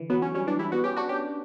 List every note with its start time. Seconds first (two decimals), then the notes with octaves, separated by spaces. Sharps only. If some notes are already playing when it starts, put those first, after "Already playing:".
Already playing: D3 E3
0.10 F#3 B3
0.22 F#3 C#4
0.34 G3 C#4
0.47 E3 D4
0.59 G3 E4
0.72 B3 F#4
0.84 C#4 G4
0.96 D4 F#4
1.09 C#4 G4